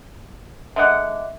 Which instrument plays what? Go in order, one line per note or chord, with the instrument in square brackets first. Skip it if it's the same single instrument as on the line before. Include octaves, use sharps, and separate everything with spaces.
[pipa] D3 G#3 F#5 [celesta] E5 D6